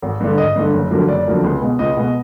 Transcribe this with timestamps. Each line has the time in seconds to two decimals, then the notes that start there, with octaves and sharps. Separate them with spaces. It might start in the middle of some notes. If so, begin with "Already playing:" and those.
0.02 G#1
0.20 G2 D3
0.38 G#1 D#5
0.56 G2 D3
0.73 F#1
0.91 F2 D3 F#3 A#3
1.08 F#1 D5
1.26 F2 D3 F#3 A#3
1.44 C#2
1.61 B2 G#3 B3
1.79 C#2 D#5
1.97 B2 G#3 B3